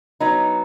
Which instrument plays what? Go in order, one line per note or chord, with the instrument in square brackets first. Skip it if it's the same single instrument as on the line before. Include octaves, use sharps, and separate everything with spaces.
[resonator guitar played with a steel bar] F#3 B3 D#4